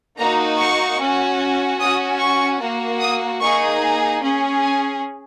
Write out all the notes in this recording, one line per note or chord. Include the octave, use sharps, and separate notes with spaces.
A#3 D#4 F#4 A#5
C#6
C#4 F#4
C#4 F#4 D#6
C#6
A#3 F#4
D#6
A#3 D#4 G#4 C#6
A#5
C#4 G#4
G#5